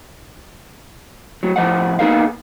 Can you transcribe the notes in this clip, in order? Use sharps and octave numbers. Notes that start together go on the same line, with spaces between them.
F#3 A3
A2 F3 D#5 F#5
A#3 B3 D#4 G#4 A#4 F5